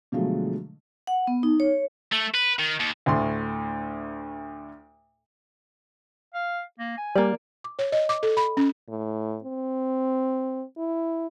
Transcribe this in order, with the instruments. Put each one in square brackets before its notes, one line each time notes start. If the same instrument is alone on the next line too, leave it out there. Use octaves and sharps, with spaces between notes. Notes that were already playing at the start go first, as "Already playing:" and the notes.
[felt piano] B2 D3 F3 F#3 G#3 A3
[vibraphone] F#5
B3
D#4
C#5
[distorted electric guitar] A3
B4
D#3
D#2
[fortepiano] D2 A2 C6
[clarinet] F5
A#3
G#5
[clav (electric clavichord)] G3 [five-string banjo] A#3 D5
[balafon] D6
C#5
D#5
D6
A4
B5
C#4
[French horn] A2
C4
E4